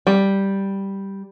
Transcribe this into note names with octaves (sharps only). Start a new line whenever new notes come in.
G3